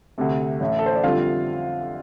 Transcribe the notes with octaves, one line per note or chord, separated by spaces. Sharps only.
D2 C3 A3
A1 A2 A3
A4
C5
D5
F2 D3 G3 F4 F5